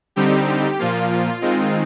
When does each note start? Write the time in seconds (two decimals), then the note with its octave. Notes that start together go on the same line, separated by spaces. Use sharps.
0.16 D3 G3 C4 D#4 G4
0.47 G4
0.79 A#2 F3 A#3 F4
1.10 F4
1.41 D#3 G#3 C4 D#4